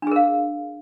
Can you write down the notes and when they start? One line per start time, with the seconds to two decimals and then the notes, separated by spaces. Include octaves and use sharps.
0.02 D4
0.07 G#4
0.11 A#4
0.16 F5